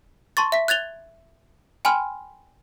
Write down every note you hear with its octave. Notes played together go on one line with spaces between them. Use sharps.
A5 C6 C#6 A6
E5 B6
F#6 G#6 A6 F7 G7
G5 G#5 B5 C6 F6